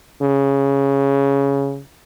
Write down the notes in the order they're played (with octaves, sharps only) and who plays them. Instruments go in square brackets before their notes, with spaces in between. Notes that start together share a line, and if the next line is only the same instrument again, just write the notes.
[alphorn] C#3